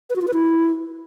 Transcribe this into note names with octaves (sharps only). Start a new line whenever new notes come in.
B4
F#4
F4
B4
E4